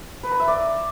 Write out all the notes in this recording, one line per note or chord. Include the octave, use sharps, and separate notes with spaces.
B4
A#5
E5
D5